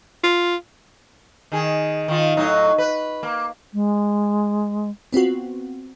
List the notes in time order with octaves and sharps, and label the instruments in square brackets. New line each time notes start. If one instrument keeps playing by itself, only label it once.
[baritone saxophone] F4
[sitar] D#3 G#4
D#3 F4
A2 F#3 D#4
B4
A#3
[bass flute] G#3
[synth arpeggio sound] B3 C4 F4 F#4